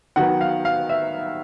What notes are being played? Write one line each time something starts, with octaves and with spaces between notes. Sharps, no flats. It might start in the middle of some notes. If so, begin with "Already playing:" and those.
D#3 F#3 B3 F#5
F5
F5
E5